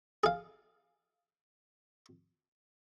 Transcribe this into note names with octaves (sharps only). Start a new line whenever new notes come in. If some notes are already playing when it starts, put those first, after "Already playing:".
G#4 F5